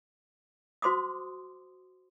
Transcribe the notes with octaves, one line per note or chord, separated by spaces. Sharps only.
F#4 C5 C6 D6 D#6